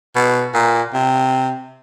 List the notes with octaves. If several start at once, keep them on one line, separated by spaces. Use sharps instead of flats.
B2
A#2
C3